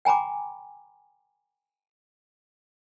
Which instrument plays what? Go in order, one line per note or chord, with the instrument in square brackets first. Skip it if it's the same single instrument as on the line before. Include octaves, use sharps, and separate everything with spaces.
[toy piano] G5 G#5 A#5 B5 D6